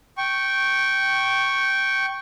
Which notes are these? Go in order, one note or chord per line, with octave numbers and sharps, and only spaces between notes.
G5 C#6